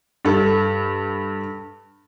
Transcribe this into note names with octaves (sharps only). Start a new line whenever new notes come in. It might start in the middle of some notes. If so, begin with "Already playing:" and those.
G2 A4